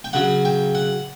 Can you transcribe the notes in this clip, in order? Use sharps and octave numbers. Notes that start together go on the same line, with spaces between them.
G5
C#3 F#3 F#5
G5
F#5